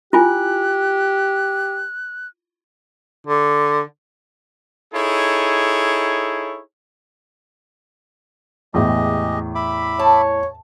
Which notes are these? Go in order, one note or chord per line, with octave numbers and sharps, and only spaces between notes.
E4 F4 G4 G#5 F#6
D3
D#4 E4 G#4 A4 C#5
E2 A2 G#3 G4 D#5
E5 B5 D6
C#5 A5